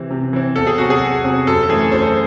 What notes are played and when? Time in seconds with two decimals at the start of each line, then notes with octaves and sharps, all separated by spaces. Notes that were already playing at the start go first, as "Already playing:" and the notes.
Already playing: C3 E3 C4
0.10 C3
0.33 E3 C4
0.56 E2 A4
0.67 G#4
0.78 C3 F#3 C4 F#4
0.90 G#4
1.01 E2
1.24 C3 F#3 C4
1.47 F#2 A4
1.63 A4
1.69 E3 A3 C4 G#4
1.81 A4
1.92 F#2 C5
2.02 A4
2.07 C5